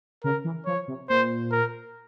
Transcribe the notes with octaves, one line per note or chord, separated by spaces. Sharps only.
C#3 A#4
E3
F3 C#5
C3
A#2 C5
A#4